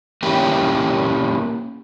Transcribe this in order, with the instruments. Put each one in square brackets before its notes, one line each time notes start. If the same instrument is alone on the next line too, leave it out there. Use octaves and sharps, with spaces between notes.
[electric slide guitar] A#3 C#4 E4 G4